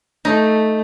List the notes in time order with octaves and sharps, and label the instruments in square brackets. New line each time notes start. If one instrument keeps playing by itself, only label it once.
[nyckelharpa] A3 [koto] D#4